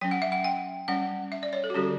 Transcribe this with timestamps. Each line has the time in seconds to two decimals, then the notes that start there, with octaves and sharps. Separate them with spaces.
0.01 F#3 C#4 G5
0.11 F#5
0.22 E5
0.32 F#5
0.44 G5
0.88 G3 C#4 F#5
1.32 E5
1.43 D5
1.53 C#5
1.64 A4
1.70 F#4
1.74 D3 G3 C#4 G4